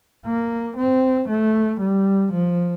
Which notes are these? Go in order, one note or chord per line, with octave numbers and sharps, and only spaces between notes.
A#3
C4
A3
G3
F3